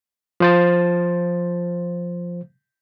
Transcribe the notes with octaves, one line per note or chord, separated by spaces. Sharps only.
F3 C5 A6